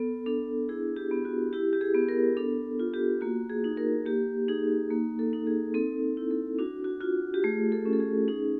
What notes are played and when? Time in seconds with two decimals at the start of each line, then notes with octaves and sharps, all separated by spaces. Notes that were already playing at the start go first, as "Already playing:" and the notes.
Already playing: B3 A4
0.26 D4 A4
0.69 E4 G#4
0.96 G4
1.11 B3
1.25 F#4
1.53 E4 G4
1.73 G4
1.81 G#4
1.94 B3
2.09 A#4
2.37 D4 A4
2.80 F4
2.94 G4
3.21 A#3 F#4
3.49 G#4
3.64 D#4
3.77 A#4
4.05 A#3 G4
4.48 D#4 G#4
4.91 A#3
5.19 A4
5.33 D#4
5.47 G#4
5.74 C4 A4
6.17 E4
6.31 A4
6.58 D4 F#4
6.84 F#4
7.01 F4 F#4
7.34 G4
7.43 A3 G#4
7.72 A4
7.85 C#4
7.93 A4
8.00 G#4
8.28 D#4 G#4